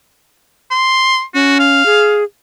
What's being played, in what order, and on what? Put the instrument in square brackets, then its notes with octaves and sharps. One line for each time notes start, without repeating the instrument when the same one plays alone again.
[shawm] C6
[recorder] C#4 [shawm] F#4
[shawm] F5
[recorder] G#4